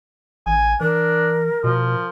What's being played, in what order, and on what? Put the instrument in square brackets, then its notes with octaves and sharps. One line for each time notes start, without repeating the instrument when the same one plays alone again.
[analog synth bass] A1 [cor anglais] G#5
[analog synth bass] E3 [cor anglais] D4 [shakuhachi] A#4
[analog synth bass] B2 [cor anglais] F3